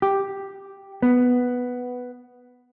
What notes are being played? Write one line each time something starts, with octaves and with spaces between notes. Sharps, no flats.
G4
B3